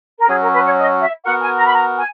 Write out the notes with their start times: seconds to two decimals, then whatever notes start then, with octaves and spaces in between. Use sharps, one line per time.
0.19 A#4
0.28 F#3 C#4 F#4 G#4
0.41 A#4
0.53 B4
0.64 C#5
0.77 D#5
1.02 E5
1.25 B3 F#4 A#4 F#5
1.41 G#5
1.57 A#5
1.66 B5
1.74 A#5
1.98 G#5